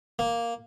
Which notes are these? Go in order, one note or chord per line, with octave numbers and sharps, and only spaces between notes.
A#3